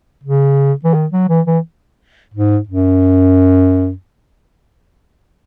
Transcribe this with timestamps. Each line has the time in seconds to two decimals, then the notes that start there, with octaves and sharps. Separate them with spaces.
0.24 C#3
0.84 E3
0.94 D#3
1.12 F#3
1.29 E3
1.46 E3
2.34 G#2
2.69 F#2